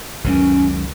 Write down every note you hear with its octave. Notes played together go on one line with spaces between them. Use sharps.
C#2 F#2 D#3 C#4